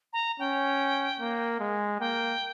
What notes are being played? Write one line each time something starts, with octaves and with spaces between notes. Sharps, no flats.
A#5
C#4 G5
A#3
G#3
A#3 G5